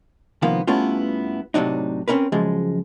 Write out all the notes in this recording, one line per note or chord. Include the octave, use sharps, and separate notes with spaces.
C2 D#3 F3 A#3 B3 F5
G2 A3 B3 C#4 E4 F4
A2 C3 F#3 D4 D#4
C4 C#4 D#4 A#4 B4
C#2 F#2 F3 G#3